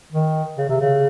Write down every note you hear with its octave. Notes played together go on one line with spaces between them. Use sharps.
D#3
C#3
C3
C#3